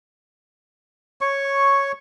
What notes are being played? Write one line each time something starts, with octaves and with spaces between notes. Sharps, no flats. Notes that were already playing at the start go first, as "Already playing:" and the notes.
C#5 C#6